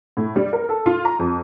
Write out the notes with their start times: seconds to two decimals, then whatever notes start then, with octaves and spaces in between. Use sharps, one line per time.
0.17 A2
0.36 G3
0.53 A#4
0.69 A4
0.86 F4
1.05 A#5
1.19 F2